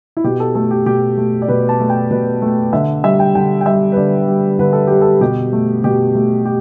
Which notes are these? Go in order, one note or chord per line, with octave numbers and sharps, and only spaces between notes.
E4
B2 G4
A4
A3 A4
G4
B2 G4
A3
D5
B2 B4
A5
A3
G5
B2 B4
A3
D3 E5
G3 E5
G5
D3 G5
G5
G3 E5
B4
D3 D5
G3
D3 B4
A4
G3 G4
A4
B2 G4
A3
B2 G4
A3
G4